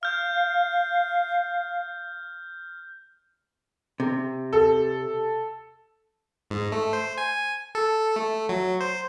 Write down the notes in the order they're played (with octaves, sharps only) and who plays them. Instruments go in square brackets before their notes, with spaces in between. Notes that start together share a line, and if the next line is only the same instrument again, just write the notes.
[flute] F5 [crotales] F6 G6
[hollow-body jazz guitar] C3
[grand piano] A4
[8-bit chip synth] G#2
A3
C5
G#5
A4
A3
F#3
C5